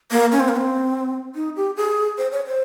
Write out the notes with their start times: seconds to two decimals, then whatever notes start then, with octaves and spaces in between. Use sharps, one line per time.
0.11 A#3
0.32 C#4
0.40 C4
0.48 A#3
0.56 C4
1.35 D#4
1.56 G4
1.77 G#4
2.18 C5
2.32 C#5
2.46 C5